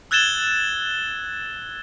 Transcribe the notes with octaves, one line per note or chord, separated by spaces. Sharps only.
E6 F#6 G#6 A6 E7 G7